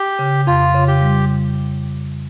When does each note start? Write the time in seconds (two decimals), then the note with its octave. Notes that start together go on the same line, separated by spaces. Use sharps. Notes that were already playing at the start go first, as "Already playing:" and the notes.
Already playing: G4
0.19 C#3
0.47 F2 F4
0.75 C#3
0.88 G4
1.01 G3